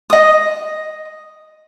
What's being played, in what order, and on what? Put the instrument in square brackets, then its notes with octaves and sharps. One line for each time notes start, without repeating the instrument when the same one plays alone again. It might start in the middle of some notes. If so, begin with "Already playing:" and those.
[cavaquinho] D#5 D#6